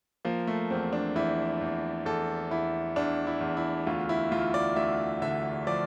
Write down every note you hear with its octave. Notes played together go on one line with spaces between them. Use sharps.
F3 A#3
A3
E2 C4
D4
E2 E4
E2
E2 A4
E2 E4
E2 D4
E4
E2
E4
D2 F4
E4
D2 F4
D5
D2 E5
D3 E5
F3 D5